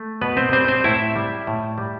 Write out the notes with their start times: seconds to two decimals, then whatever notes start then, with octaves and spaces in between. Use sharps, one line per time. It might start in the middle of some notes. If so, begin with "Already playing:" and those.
Already playing: A3
0.21 B2 B3 B4
0.37 C4 C5
0.52 G3 C4 C5
0.68 C4 C5
0.84 A2 E4 E5
1.16 G3
1.47 A2
1.78 G3